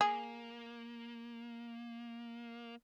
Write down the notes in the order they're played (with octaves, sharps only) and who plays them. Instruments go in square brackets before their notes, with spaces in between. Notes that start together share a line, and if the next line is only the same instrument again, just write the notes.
[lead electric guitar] A#3 [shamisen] G#4